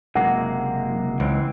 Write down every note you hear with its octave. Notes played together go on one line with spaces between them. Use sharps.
F#1 C3 G#3 A#3 F#5
C#2 E3 C4